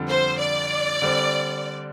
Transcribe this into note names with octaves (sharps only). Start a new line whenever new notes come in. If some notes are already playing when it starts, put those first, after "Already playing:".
Already playing: F2 D3 G3 D4 G4
C5
D5
D3 G3 C4